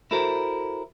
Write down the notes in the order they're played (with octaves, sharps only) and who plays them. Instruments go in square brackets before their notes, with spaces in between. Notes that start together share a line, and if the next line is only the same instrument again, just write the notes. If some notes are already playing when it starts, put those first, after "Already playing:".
[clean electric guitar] E4 F#4 A4 A#4 C5 E5